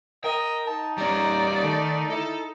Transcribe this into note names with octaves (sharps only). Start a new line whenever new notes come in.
A#4 D#5 G5
D#4 A5
G3 C#4 D5 A#5
D#3 A3
E4 A4